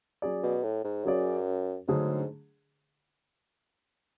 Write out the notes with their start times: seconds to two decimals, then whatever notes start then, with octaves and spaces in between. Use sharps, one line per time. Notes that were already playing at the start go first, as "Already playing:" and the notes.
0.22 F#3 C#4 G#4 D5
0.43 B2
0.63 A2
0.84 G#2
1.05 F#2 F#3 C#4 G#4 D5
1.88 G#2 D3 F#3 A3 D4 G#4